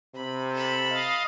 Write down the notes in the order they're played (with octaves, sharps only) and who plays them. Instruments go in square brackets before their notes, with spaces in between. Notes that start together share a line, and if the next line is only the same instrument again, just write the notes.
[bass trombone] C3 [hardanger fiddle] B5
[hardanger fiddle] A4 B5
[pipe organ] D#5 F5